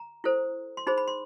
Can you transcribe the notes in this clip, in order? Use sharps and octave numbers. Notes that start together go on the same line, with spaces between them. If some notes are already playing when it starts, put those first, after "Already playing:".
Already playing: A#5
E4 A4 C5
C6
D#4 G#4 C5 B5
B5
C6